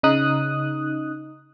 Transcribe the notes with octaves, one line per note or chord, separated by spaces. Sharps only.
C#3 D#4 D#6 F#6